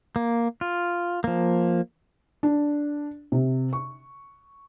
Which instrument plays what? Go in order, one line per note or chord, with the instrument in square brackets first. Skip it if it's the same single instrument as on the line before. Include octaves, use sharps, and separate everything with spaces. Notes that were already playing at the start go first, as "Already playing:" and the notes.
[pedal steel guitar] A#3
F4
F3 A#3
[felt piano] D4
C3
C#6